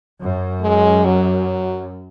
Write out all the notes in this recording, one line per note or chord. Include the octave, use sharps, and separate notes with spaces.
F#2
G#3
F#3